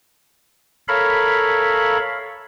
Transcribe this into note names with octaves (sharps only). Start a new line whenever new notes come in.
A4 A#4 C#5 E5 F5 B5